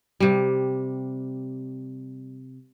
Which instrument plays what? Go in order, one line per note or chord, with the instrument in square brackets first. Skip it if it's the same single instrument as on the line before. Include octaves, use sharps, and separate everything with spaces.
[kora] C3 G3